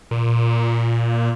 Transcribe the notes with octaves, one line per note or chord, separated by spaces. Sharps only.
A#2